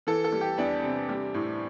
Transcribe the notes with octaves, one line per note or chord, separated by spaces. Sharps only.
E3 A4
A4
G3
G4
E2 D4
C3
G3
A2